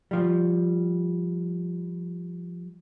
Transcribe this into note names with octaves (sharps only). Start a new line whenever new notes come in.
F3 G3